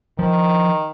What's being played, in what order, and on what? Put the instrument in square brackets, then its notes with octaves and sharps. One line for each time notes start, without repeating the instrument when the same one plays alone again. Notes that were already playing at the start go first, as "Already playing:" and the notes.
[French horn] D#3 [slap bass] F3